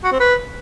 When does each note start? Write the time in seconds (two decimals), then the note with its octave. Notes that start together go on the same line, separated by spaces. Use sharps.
0.04 F#4
0.12 C4
0.20 B4